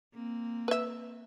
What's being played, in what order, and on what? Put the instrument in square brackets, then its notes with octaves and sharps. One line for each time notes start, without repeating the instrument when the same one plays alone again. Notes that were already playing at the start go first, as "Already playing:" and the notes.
[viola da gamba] A#3 C4
[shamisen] B4 E5